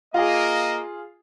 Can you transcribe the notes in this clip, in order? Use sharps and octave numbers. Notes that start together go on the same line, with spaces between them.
A#3 F4 G#4 D#5